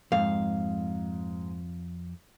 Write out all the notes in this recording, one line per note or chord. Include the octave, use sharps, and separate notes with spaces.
F2 G#2 F5